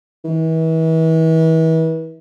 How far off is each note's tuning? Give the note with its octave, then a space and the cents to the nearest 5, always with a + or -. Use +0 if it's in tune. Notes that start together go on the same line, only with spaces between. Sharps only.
E3 -35